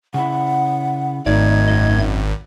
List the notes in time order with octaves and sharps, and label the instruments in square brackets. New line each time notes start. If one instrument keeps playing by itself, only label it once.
[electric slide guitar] C#3 E4 [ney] F#5
[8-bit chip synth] G#1 [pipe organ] G#2 A3 G#6 [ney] D#4 [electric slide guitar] D5
[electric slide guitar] F#2 D#5